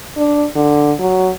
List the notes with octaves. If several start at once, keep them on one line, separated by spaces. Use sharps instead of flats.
D4
D3
F#3